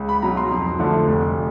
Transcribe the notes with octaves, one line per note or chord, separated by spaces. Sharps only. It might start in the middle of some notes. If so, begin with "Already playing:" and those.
Already playing: C#2
B5
B2 F#3 A#5
C6
F2
D3 F3 A3
F1